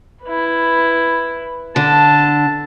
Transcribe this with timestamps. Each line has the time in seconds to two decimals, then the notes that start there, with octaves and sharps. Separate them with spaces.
0.24 E4 B4
1.76 D3 A5